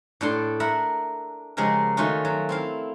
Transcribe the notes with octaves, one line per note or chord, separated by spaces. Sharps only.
A2 D4 A4 C6
A#4 E5 F#5 B5
C#3 F3 G#3 G4 A#4
D#3 A3 C#4 F4 F#4
F#3
C4 E4 F5